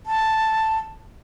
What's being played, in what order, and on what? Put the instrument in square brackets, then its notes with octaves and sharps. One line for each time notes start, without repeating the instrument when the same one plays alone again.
[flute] A5